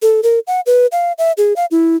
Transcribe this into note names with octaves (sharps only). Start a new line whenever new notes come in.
A4
A#4
F#5
B4
F5
E5
G#4
F5
E4